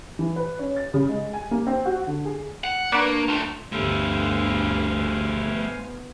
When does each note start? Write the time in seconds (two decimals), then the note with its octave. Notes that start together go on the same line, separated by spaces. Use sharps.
0.19 E3
0.36 B4
0.59 C#4
0.77 A6
0.94 C#3
1.09 G#3
1.33 G#5
1.51 A#3
1.67 C4
1.85 F#4
2.07 D3
2.25 G#4
2.64 F#5
2.92 A#3 D4 B4 D5 C#6
3.29 A3 F4
3.72 G1 D2 G3 A3 C5 F5 G#5
5.45 B3